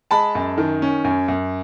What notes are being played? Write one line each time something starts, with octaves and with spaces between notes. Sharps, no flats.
G#3 A5 B5
F#2
D#3
C#4
F#2
F#2